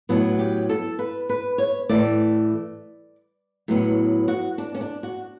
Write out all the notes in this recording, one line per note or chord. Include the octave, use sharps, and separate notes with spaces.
A2 F#3 B3 F#4
G4
A4
B4
B4
C#5
A2 E3 A3 D5
A2 F#3 B3
F#4
D4
C#4
D4
F#4